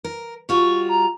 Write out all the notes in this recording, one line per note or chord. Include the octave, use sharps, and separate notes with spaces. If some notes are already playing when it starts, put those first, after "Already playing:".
A#4
G3 F4 F#4 C#6
A#5